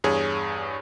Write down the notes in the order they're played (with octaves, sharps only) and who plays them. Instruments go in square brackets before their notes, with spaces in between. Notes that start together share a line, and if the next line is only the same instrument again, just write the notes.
[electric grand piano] E2 G2 G#4 C#5